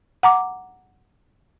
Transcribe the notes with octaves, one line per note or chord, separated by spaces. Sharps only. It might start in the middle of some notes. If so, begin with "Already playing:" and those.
F#5 A#5 D6